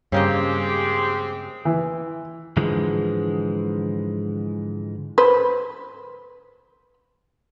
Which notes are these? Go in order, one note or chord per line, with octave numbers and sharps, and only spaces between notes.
G2 C#3 G#3 A#3 C4 G4 D#5
E3
G#2 D3 E3 F3 G#3
B4 C5